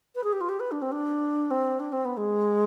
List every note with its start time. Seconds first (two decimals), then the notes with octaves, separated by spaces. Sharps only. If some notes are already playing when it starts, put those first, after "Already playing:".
0.15 B4
0.23 G#4
0.32 G4
0.40 F4
0.49 G4
0.60 B4
0.71 D4
0.82 C4
0.91 D4
1.50 C4
1.79 D4
1.92 C4
2.05 B3
2.17 G#3